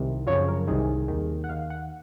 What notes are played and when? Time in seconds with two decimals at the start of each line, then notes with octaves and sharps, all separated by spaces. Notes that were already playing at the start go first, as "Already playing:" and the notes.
Already playing: C2 C3 D#3
0.27 F#2 C#3 F3 C#5
0.48 A#4
0.67 C2 C3 D#3 G#4
1.08 D#2 D#3
1.44 F#5
1.49 D#2 D#3 F5
1.70 F#5